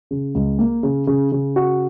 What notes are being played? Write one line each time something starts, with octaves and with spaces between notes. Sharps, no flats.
C#3
C#2
A#3
C#3
C#3
C#3
F#4